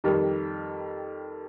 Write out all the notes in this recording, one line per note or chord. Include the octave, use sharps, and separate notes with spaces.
F2 D#3 G3